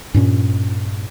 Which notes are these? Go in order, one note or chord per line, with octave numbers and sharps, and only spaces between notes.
G2 A#2 C#4